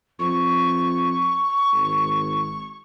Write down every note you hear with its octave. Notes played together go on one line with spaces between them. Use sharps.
F2 C#6
G#1